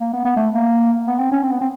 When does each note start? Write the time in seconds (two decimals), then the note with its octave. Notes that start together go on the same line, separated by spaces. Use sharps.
0.01 A#3
0.13 B3
0.25 B3
0.36 A3
0.54 A#3
1.07 B3
1.19 C4
1.31 C#4
1.43 C4
1.51 B3
1.61 C4